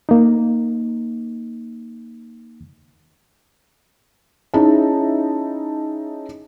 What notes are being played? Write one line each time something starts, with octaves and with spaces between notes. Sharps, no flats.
A#3 D#4
C#4 D#4 E4 G#4 E5 A5